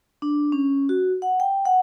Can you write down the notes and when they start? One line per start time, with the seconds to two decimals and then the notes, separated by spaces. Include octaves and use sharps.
0.22 D4
0.52 C#4
0.89 F#4
1.22 F#5
1.40 G5
1.66 F#5